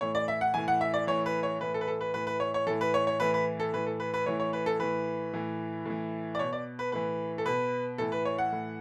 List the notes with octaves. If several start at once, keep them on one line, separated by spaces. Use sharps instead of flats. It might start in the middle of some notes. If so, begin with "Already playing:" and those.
A2 E3 C#5
D5
E5
F#5
A2 E3 G#5
F#5
E5
D5
A2 E3 C#5
B4
C#5
A2 E3 B4
A4
B4
A4
B4
A2 E3 B4
B4
C#5
C#5
A2 E3 A4
B4
C#5
C#5
A2 E3 B4
B4
A4
A2 E3 B4
A4
B4
B4
A2 E3 C#5
C#5
B4
A4
A2 E3 B4
A2 E3
A2 E3
D5
B2 C#5
D5
B4
A2 E3 B4
A4
B2 B4
A2 E3 A4
B4
C#5
F#5
A2 E3